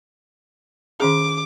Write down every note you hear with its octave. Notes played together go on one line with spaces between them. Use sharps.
D#3 C#4 G#4 D6